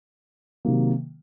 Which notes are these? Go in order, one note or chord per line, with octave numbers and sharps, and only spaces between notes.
C3 D#3 F#3 A#3